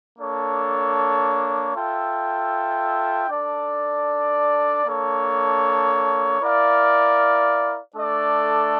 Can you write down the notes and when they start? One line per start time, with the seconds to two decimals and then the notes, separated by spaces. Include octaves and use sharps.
0.19 A#3 D4 A4 C#5
1.75 F4 A4 E5 G5
3.29 D4 A4 D5
4.86 A#3 D4 A4 C#5
6.41 E4 A#4 D5 F5
7.96 A3 D4 A4 D5